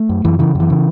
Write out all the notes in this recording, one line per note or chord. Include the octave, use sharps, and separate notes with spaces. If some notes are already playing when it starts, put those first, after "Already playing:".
Already playing: A3
F#2
F#2 E3
C#3 E3
F#2
E3
C#3